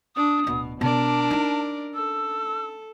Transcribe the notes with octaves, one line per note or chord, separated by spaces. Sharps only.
D4 D#6
D1 B2 D4
B2 D4 A#4 D5 A5
C#4 D#4
A4 E6